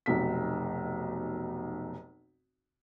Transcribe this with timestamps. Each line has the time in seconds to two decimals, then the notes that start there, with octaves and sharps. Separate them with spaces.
0.06 F1 B1 B6